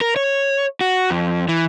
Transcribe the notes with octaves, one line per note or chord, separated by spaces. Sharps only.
A#4
C#5
F#4
F2
E3